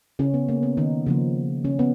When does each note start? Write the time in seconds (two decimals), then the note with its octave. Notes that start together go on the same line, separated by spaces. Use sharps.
0.19 C#3 C#4
0.34 B3
0.49 A#3
0.63 B3
0.77 D#3 D#4
1.06 C#3 F3 A#3
1.65 C#3 C#4
1.79 B3